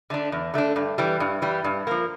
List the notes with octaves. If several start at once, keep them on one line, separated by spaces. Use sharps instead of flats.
D3 A3 D4
E2
D3 A3 D4
G2
E3 G3
G2
E3 G3
G2
F3 A#3